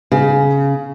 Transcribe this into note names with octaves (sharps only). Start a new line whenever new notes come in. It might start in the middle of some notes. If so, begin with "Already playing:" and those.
C#3